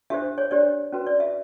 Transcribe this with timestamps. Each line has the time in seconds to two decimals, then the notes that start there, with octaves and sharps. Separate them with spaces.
0.10 D4 G4 C5 E5
0.38 C#5
0.51 D4 G4 C5 D5
0.92 C#4 F#4 B4
1.07 D5
1.20 E5